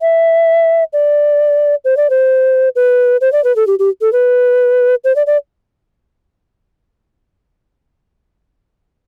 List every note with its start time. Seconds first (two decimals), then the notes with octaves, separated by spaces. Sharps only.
0.02 E5
0.93 D5
1.85 C5
1.97 D5
2.10 C5
2.76 B4
3.21 C5
3.33 D5
3.44 B4
3.56 A4
3.67 G4
3.79 G4
4.01 A4
4.13 B4
5.04 C5
5.16 D5
5.27 D5